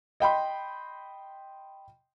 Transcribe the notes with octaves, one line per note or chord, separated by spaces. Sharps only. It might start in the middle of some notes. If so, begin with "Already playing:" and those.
D#5 G5 B5 C6